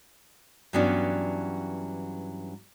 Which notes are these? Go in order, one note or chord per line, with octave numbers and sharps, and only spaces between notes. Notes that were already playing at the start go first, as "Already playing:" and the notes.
G2 E3 F#3 B3 C#4 D4